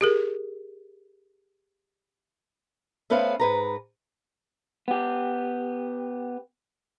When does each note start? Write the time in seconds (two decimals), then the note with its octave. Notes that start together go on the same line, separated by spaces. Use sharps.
0.01 G4 G#4 A#4
3.10 A3 B3 C#4 B4 C5 F5
3.40 G#2 B4 A#5
4.88 B3 G4